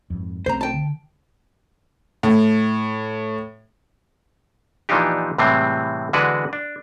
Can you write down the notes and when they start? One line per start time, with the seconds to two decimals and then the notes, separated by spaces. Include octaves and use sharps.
0.10 F2 G#2
0.46 B1 A3 C4 C5 A#5
0.61 G5 A5
0.74 D3
2.23 A2
4.89 A#2 E3 F3 D4 D#4 G4
5.38 A2 C3 E3 G3 G#3 C4
6.13 D3 E3 G#3 F#4 B4 D5
6.53 D4